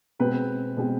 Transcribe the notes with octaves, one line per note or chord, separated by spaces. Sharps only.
B2 G#3 C4 B4
B2 G#3 C4